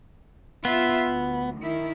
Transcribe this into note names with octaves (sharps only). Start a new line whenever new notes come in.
B3 F4 E5
D2
D#3 E4